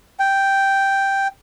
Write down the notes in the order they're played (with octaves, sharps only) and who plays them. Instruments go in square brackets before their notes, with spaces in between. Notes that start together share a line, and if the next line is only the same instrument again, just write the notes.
[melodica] G5